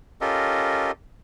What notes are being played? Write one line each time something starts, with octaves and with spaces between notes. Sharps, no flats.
C#4 F4 G4 A4 A#4 D#5